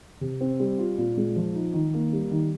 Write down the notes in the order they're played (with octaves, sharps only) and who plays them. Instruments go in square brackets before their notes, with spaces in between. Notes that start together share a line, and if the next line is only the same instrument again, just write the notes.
[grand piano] C3
C4
G3
F4
A#2
G#3
F3
D#4
D#3
A#3
G3
D#3